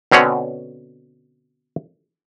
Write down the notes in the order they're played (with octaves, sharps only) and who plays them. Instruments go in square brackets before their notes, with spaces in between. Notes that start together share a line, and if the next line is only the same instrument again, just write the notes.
[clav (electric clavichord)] B2 D3 C4 C#4 C#5 F#5